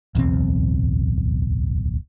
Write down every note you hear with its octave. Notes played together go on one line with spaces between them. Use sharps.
D1 B1 E2 C4